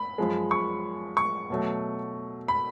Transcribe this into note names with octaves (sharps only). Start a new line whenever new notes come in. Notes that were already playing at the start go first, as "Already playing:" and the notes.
Already playing: B5
F#2 F3 G#3
C#6
C#6
B2 F#3 A3
B5